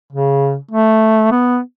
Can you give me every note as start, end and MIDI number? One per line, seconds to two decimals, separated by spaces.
0.13 0.56 49
0.71 1.27 57
1.31 1.60 59